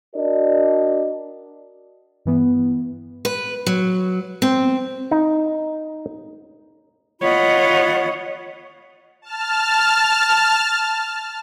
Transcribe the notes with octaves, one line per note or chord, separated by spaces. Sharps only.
D4 F#4 A#4 D5 D#5
G2 E3 B3
B4
F#3
C4
D#4
F4 C#5 D#5 F#5 B5
A5 F6